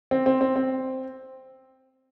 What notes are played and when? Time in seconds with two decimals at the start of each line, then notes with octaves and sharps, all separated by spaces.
0.11 C4
0.26 C4
0.41 C4
0.56 C4